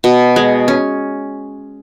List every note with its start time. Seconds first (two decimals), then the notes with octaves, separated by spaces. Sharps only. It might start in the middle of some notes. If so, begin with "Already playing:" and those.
0.04 B2
0.36 G#3
0.68 C#4